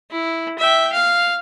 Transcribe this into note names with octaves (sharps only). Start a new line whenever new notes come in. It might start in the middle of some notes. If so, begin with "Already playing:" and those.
E4
E5 G5
F5